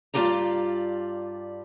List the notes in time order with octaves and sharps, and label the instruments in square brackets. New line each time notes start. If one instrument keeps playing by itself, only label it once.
[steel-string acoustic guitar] G2 F3 F4 G4 D5 A#5